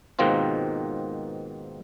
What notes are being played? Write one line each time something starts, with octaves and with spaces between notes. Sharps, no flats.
G#2 B2 D#3 A#3 C4 F4